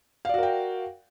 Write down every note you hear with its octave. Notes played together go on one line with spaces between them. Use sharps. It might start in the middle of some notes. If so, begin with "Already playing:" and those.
F#4 A#4 D5 F5 G5